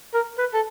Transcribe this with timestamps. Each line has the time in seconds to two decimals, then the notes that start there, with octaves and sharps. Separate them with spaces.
0.14 A#4
0.38 B4
0.54 A4